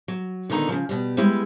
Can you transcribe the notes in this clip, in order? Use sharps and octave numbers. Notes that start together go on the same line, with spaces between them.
F#3
A#2 D3 D#3 B3 D#4 A#5
C#3 F3
B2 G3
G3 G#3 B3 E4 B4